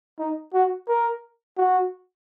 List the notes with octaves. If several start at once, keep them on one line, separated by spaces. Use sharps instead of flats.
D#4
F#4
A#4
F#4